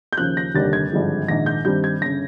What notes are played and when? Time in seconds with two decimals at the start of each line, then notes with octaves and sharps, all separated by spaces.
0.13 G6
0.17 D#2 C#3 F3 F#6
0.37 A#6
0.54 F1 D#2 D3 G3 A6
0.73 G#6
0.91 G#1 G2 D3 F3 G#3
1.28 A#1 G#2 D#3 A#6
1.46 G6
1.65 G2 D#3 G3 C4 G6
1.84 G#6
2.01 G1 C#3 A#6